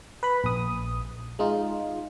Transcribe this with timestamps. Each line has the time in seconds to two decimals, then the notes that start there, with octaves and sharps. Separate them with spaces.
0.23 B4 B5
0.44 A#1 D#6
1.39 G#3 D#4 F4